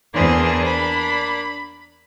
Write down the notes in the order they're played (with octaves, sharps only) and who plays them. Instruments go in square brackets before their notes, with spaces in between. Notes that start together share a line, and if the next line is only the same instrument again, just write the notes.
[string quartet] E2 G#4 C5 [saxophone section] A#3 D4
[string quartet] B5